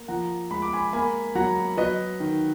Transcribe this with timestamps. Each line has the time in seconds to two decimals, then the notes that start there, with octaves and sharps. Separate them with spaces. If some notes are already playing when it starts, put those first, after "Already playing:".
Already playing: A#3
0.08 F3 F#5 A#5
0.51 G#3 B5
0.62 D6
0.73 G#5 B5
0.93 A#3 G#5 B5
1.35 F#3 F#5 A#5
1.77 F#3 B4 D#5
2.20 D#3